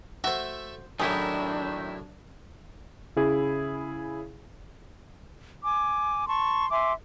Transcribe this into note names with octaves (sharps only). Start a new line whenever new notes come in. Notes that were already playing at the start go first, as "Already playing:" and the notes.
A3 F#4 C5 E5
F#2 A2 D#3 F#3 D4 E4 G4 G#4
C#3 E4 G#4
G#5 D6
A5 C6 C#6
E5 G#5 C6 D6